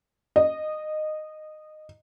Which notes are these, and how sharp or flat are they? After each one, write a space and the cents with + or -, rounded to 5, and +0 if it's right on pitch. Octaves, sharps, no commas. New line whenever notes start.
D#5 -15